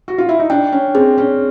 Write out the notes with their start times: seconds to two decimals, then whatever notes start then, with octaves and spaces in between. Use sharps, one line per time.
0.08 F#4
0.18 F4
0.29 E4
0.39 D#4
0.50 D4 G5
0.72 C#4
0.95 C4 G#4
1.18 C#4